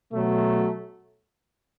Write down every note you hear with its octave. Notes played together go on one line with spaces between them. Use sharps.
B2 F#3 A3